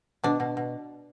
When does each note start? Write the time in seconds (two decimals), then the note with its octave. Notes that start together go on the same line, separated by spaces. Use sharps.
0.24 B2 D4
0.40 B2
0.57 B2